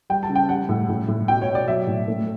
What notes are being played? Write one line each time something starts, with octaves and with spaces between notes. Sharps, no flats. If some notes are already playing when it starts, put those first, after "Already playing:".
G3 G5
A5
C#3
G5
G3 F#5
A2
A2
A2
B2 G5
C#5
B2
D5
F#3 E5
A2
A3